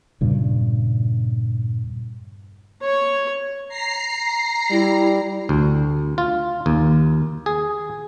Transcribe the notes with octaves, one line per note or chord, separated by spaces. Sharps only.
E2 G2 A#2 C#3
C#5 C#6
A#5 C7
G3 E4
D2
F4
D#2
G#4